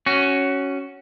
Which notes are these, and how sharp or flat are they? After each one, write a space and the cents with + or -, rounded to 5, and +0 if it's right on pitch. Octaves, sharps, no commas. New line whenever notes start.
C#4 +0 F#4 +15